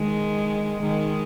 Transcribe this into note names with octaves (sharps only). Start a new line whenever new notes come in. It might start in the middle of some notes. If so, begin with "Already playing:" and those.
Already playing: D#3 G#3
D#3 G#3